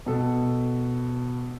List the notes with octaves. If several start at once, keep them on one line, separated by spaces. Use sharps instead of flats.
B2 A4